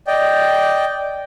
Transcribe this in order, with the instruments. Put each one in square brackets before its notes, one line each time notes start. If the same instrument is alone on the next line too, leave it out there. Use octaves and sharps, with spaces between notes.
[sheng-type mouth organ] D5 D#5 G5